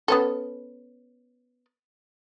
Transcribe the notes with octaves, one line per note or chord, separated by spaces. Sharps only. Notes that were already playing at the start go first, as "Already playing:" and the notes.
B3 C#4 A4